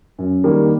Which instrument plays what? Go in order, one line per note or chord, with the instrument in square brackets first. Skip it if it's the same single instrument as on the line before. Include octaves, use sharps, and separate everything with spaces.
[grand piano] F#2
D#3 G3 A#3